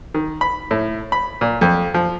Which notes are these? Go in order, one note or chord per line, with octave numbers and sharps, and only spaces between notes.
D#3
B5
A2
B5
A#2
F2
F3